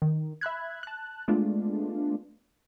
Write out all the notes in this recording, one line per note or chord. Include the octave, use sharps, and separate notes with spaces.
D#3
E5 B5 F#6 G#6
A5 F#6
G#3 A3 B3 D4 F4